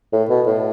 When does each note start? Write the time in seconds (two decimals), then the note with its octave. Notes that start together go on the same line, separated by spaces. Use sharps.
0.13 A2
0.29 B2
0.47 A2